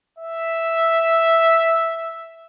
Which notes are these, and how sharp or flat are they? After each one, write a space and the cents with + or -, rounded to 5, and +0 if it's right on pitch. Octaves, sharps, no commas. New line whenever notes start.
E5 +0